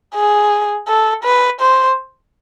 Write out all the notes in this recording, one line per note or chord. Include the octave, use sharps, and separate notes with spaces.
G#4
A4
B4
C5